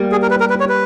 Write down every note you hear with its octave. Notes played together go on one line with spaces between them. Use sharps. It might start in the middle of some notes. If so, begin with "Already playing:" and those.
Already playing: G3 A#3
G#4
A#4
B4
A#4
B4
C#5
B4